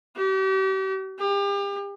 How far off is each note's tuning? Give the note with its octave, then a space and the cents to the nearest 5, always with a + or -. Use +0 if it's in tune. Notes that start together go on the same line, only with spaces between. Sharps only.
G4 -40
G4 +35